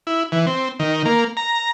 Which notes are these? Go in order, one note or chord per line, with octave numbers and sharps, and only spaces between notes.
E4
E3
C4
D#3
A#3
A#5